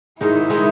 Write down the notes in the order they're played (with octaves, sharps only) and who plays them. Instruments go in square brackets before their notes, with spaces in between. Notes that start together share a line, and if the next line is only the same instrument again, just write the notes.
[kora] G#2 D#3 G#3 D#4 [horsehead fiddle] E4
[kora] D#3 G#3 D#4